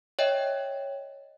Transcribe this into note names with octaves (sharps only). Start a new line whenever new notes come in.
C#5 D#5 E5 G5